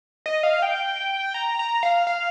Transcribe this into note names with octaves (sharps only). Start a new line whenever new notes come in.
D#5
F5
G5
A#5
A#5
F5
F5